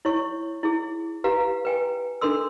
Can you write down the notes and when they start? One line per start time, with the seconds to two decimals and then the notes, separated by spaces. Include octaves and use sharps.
0.05 E4 C#5 C#6
0.63 E4 G#4
1.24 G4 B4 F5 A#5
1.65 B4 G5 G#5
2.21 D4 A4 A#4 C6 E6